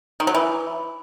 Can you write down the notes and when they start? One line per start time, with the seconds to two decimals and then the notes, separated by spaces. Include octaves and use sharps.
0.20 D#3
0.27 F#3
0.35 E3